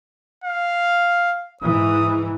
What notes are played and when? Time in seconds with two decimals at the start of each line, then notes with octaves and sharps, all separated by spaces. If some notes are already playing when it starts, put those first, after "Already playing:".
0.44 F5
1.62 G#2 E3 D#6